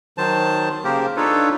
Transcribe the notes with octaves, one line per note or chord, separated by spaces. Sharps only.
D#3 F#3 C5 A5
C#3 A#3 G4 A#4 C5
D4 D#4 F4 A4 B4 C#5